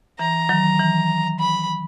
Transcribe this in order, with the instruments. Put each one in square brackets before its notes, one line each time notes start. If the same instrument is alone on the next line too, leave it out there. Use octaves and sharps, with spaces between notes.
[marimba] E3 [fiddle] A#5
[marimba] D#3 F#3
E3
[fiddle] B5